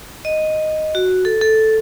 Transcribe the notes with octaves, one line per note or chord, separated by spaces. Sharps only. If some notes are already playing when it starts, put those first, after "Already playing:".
D#5
F#4
A4
A4